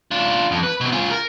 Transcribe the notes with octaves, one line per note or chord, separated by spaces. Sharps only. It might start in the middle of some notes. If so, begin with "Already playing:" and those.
D4 F4
F2
B4
B2 C4
F4 G#4
A#4